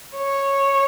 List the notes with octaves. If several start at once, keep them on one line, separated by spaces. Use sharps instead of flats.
C#5